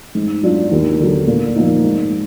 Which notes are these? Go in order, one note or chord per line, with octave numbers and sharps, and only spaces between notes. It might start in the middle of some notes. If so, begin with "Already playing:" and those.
G#2
F#3 D4 F4
D#2
D3 F#3
A#2
F3 A#3 D#4
G#2